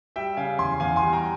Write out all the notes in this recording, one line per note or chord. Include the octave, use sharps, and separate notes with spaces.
G3 E5 G5
C#3 F5 G#5
E2 G#5 C6
E2 F5 G#5
G#5 C6
G3
G5 A#5